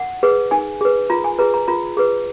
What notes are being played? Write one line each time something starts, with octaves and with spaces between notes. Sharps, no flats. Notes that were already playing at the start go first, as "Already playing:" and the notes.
Already playing: F#5
G#4 B4
D#4 G#5
G#4 B4
F4 A#5
G#5
G#4 B4 A#5
A#5
F4 A#5
G#4 B4